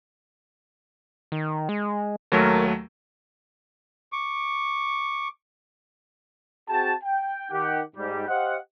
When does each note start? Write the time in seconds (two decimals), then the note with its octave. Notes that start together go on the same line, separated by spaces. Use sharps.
1.32 D#3
1.69 G#3
2.32 D#2 F#3 A3 A#4
4.12 C#6 D6
6.69 C4 F#4 G#4 G5 A5
7.04 G5
7.51 D#3 G4 F#5
7.96 G#2 G3 G4
8.28 G4 C5 D#5 F5 F#5